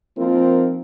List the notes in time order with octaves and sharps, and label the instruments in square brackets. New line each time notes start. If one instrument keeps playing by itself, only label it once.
[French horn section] F3 A#3 C4 D#4 F4 A#4